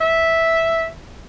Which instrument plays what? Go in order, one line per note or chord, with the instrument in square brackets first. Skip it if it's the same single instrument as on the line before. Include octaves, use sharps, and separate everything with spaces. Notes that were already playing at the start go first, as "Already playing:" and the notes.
[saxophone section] E5